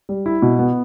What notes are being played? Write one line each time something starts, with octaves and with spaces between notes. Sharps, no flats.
G3
E4
B2
B3